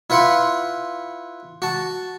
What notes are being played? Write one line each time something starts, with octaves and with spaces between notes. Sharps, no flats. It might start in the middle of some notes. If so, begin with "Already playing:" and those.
E4 F4 B4 F#5 C6
F#4 A5